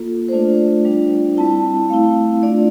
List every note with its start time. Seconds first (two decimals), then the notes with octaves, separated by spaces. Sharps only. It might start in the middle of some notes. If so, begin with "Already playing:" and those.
Already playing: A#3 F4 A4
0.29 C5
0.32 A3 D4 F4 D5
0.85 G3 D4 F4
1.37 G3 C4 E4 A5
1.90 A3 C4 E4 F5
2.42 A3 D4 F4 D5